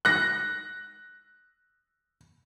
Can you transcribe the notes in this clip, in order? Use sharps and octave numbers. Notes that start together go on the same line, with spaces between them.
F#6 A#6